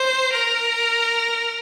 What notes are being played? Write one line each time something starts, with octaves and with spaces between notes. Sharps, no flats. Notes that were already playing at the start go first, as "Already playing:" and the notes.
Already playing: C5
A#4